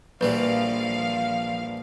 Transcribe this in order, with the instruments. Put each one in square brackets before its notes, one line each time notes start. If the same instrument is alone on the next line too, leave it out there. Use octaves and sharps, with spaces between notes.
[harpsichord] A#1 E3 G3 [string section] F3 F5 [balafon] B4